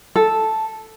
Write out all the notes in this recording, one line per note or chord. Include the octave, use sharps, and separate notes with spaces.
A4